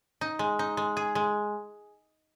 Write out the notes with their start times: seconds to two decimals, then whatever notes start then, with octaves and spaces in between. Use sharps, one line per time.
0.21 D#4
0.39 G#3
0.59 D#4
0.77 G#3
0.97 G#4
1.15 G#3